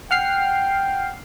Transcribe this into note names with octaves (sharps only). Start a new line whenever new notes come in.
F#5 G5 F6 C7